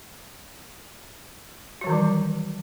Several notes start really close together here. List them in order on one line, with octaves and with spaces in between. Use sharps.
F#4 F#3 D#3 E3 G3